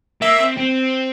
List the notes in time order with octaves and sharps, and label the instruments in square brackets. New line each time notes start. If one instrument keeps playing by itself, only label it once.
[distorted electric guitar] A#3 [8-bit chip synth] E5
[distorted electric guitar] C4
C4